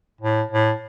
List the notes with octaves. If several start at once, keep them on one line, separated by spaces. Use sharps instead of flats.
A2
A2